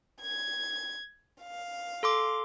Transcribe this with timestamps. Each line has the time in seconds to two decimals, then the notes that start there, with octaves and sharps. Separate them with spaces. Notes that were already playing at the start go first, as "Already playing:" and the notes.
0.21 G#6
1.42 F5
2.03 A4 C6 D6